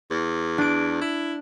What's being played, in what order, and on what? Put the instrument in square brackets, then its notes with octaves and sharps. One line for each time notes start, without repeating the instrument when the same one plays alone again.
[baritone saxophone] E2
[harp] D4 D7
[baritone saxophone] E4